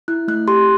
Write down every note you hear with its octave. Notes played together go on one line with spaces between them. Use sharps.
E4 F#6
A3 F#6
G4 C6